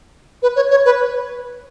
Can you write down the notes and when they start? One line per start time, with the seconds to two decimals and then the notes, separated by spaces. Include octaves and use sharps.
0.43 B4
0.56 C#5
0.71 C#5
0.85 B4